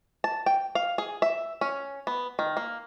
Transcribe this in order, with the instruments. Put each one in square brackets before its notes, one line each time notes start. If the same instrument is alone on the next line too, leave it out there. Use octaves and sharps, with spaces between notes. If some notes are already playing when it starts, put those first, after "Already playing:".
[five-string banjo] A5
G5
F5
G#4
E5
C#4
B3
D#3
A#3